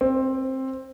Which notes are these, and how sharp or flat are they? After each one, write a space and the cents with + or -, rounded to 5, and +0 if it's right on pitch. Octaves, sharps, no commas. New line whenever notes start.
C4 +15